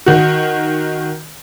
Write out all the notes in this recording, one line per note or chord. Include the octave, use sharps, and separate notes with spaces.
D#3 F#4